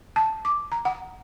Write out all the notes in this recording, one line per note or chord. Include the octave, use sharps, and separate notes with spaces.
A5
D6
A#5
F#5